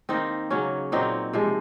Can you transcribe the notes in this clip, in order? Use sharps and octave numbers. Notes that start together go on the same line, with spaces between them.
D#3 A#3 C4 D#4
C#3 F#3 A#3 C#4
A#2 F#3 A#3 C4 D#4
C3 F3 G#3